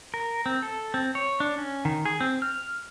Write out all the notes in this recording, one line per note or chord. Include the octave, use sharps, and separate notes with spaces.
A#4
C4
A4
C4
C#5
D4
C#4
D#3
G#4
C4
F6